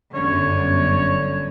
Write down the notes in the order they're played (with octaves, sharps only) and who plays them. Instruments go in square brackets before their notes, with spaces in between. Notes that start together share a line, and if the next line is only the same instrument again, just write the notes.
[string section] G1 F#2 D3 [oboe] C#5